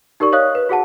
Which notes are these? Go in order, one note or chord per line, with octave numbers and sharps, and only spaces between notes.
D#4 G4 A#4 D5 C#6
C#5 D#5 F5 D#6 F#6
B4
F#4 G#4 F#5 A5